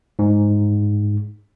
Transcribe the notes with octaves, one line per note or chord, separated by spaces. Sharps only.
G#2